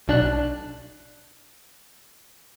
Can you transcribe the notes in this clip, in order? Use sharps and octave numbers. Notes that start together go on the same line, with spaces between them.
B1 D4 F#6